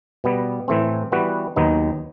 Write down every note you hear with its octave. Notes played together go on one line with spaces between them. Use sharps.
B2 G3 B3
A2 E3 A3 C4
E3 G3 B3 F#4 B4
D#2 D#3 F#3 B3 D#4